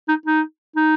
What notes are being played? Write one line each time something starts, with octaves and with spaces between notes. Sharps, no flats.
D#4
D#4
D#4